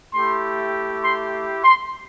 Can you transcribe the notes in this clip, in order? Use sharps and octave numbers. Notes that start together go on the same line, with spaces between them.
A3 E4 G4 C6
C6
C6